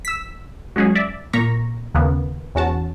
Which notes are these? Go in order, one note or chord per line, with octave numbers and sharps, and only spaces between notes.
E6 B6
F#3 G#3 C#4 F#4 G#4
D5 E5
A#2 A#3 A#5 C#6 B6
D#2 C#3 A#3 B3
E2 C#4 F#4 A5